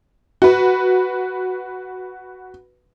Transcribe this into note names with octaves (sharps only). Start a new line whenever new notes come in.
F#4 B4